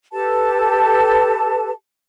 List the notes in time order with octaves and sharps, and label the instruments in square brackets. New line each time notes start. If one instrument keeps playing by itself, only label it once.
[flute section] G4 A4 B4 A5